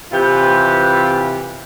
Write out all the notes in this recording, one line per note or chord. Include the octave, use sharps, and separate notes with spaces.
C3 E3 F4 G4 B4